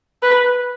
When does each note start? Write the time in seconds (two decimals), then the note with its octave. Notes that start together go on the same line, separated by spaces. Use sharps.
0.23 B4